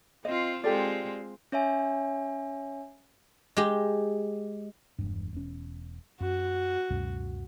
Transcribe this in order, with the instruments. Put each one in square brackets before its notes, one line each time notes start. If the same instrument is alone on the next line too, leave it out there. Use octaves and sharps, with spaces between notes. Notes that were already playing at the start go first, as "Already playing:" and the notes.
[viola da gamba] C4 F4 [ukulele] D#5
[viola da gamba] G#3 C4 F4 [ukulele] G4 A4 D5
[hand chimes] C#4 C#5 E5 G#5
[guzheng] G#3 G4
[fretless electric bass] E1 G2
E1 C#4
[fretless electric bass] F#2 [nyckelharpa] F#4
[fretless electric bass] C#2 F#2 B2